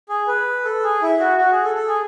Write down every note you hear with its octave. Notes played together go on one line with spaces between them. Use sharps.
G#4
B4
A4
G#4
E4
F#4
F#4
G#4
A4
A4
G#4